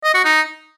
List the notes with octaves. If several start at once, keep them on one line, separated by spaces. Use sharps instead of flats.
D#5
F#4
D#4